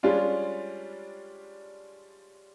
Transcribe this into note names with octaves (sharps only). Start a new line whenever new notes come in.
G3 G#3 C#4 D4 F4